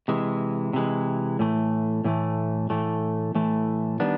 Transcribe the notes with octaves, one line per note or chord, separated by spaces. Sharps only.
C3 E3 G#3
C3 E3 G#3
A2 E3 A3
A2 E3 A3
A2 E3 A3
A2 E3 A3
D#3 G3 B3 D4